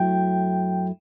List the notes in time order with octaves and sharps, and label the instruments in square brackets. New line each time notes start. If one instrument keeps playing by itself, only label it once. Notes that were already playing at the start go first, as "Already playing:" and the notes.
Already playing: [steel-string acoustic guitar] F#2 F#3 A3 E4 [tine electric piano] G5